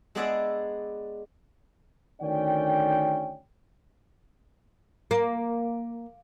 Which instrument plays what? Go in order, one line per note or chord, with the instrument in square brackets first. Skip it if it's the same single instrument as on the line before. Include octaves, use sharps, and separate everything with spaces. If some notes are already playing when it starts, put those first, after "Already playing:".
[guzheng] G#3 B3 D4 G#4 D5 E5
[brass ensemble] D2 D#3 C#4 D5 G5
[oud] A#3